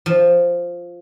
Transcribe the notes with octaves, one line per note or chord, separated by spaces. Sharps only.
F3